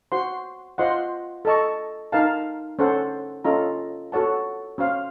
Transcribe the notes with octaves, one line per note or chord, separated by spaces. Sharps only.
F#4 C5 F#5 C6
F4 C5 D#5 F#5 C6
A4 D#5 A5 C#6
D#4 A#4 F5 A5
C#4 A4 C5 F#5
C#4 F4 A4 D#5 A#5
F#4 A4 C#5 F#5 A5
C#4 F#4 C5 F5